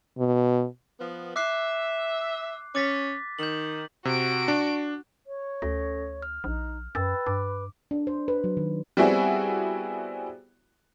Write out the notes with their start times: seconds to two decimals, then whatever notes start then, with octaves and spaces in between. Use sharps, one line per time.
0.18 B2
0.99 F3 B3
1.36 E5 D6 F#6 C7
2.75 C#4 D6 A6 B6
3.39 D#3 G6 F#7
4.05 C3 F#4 D7
4.48 D4
5.26 C#5
5.62 D2 C#4 A4 A#6
6.22 F6
6.44 A#1 D#4
6.95 F#2 B4 G5 E6 A6
7.27 G2 D6
7.91 D4
8.07 C5
8.28 B4
8.44 F#3
8.57 D#3
8.97 G3 B3 C4 E4 F#4 G#4